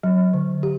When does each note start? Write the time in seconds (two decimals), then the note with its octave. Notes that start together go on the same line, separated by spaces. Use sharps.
0.03 F#3
0.33 D3
0.63 G4